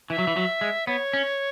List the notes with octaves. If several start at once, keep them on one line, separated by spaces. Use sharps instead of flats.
E3 E5
F#3
E3
F#3
G#3
B3 C#5
C#4